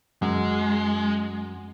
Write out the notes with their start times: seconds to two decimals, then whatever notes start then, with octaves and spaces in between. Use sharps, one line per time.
0.22 F#2 G#3